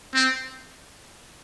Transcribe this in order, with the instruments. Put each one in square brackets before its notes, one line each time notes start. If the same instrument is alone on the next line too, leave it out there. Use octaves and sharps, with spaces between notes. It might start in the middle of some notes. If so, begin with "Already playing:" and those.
[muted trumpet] C4